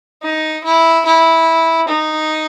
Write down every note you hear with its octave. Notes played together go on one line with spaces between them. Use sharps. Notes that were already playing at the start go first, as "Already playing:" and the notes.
D#4
E4
E4
D#4